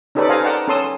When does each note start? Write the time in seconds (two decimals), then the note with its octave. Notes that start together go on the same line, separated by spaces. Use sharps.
0.15 C#4 D#4 G4 A4 B4 D5
0.29 A4 C5 D#5 F5 G#5 A#5
0.44 A#4 D5 F#5 G5 A5 A#5
0.68 C#4 A4 A5 C6 D#6 E6